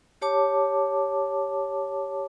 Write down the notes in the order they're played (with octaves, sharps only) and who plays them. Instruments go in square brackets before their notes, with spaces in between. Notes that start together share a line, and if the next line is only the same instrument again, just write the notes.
[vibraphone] G4 C#5 A5 D6